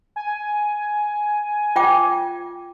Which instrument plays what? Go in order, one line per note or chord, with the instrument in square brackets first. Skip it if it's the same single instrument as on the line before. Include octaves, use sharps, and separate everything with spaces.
[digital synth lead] G#5
[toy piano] F4 G5 D6